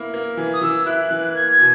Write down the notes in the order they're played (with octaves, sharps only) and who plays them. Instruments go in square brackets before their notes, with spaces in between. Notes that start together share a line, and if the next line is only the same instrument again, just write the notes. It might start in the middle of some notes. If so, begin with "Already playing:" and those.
Already playing: [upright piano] A#3 E4
A#3
E3
[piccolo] D#6
[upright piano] E3 [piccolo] E6
[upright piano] E4 [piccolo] F#6
[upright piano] E3
[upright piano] A#3 [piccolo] G#6
[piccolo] G#6
[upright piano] B2